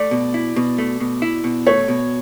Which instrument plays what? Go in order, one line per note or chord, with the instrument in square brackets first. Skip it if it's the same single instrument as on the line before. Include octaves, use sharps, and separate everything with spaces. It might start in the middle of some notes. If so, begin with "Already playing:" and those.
Already playing: [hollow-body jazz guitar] A3 [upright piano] D5
[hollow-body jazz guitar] B2
E4
B2
A3
B2
E4
B2
[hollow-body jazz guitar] A3 [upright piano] C#5
[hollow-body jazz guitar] B2